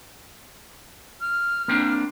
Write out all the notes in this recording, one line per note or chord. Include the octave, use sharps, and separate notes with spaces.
F6
A#3 C4 D4